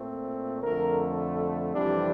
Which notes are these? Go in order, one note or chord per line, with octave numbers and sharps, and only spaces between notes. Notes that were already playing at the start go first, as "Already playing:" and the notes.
Already playing: A#2 A3 C4
F2 D3 A3 A#4
F2 C3 E3 G3 C4 D4